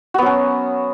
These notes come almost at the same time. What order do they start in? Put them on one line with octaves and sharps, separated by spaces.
F#4 B3 F#3 C#4